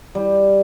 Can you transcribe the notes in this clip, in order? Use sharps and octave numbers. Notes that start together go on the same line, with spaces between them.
G3